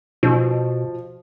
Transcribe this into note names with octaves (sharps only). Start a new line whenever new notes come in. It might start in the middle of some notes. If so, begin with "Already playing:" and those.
B2 F3